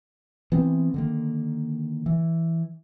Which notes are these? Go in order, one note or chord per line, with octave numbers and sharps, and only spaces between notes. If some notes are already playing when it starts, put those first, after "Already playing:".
E3 B3 C4
D3 D#3 A#3
E3